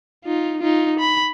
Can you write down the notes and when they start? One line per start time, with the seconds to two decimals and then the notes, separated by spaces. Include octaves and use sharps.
0.25 D#4 F4
0.61 D#4 F4
1.00 B5